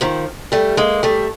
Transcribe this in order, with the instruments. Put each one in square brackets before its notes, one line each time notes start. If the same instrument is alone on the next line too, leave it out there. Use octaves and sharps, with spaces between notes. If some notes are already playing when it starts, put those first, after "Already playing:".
[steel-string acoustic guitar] D#3 F3
G3 A3
G#3 A#3
G3 A3